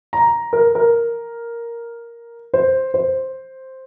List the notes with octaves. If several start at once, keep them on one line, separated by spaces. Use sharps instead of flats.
A#5
A#4
A#4
C5
C5